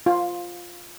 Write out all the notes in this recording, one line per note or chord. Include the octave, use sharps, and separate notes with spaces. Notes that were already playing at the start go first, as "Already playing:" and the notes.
F4